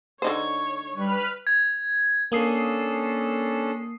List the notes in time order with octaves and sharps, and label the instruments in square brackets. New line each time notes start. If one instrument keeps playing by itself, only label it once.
[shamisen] D3 D#4 C5 [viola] C#5 C#6
[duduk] G3 [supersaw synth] B4 B5 F6
[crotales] G#6
[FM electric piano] A#3 D#6 C7 [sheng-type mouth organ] C#4 D4 A4